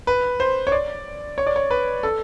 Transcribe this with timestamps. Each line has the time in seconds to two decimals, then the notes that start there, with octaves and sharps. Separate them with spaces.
0.07 B4
0.40 C5
0.67 C#5
0.72 D5
1.38 C#5
1.47 D5
1.56 C#5
1.71 B4
2.03 A4